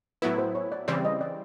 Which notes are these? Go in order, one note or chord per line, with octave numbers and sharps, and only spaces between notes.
A2 F#3 B3 E4 B4
C5
C#5
D5
C#3 E3 G3 C4 D5
D#5
D5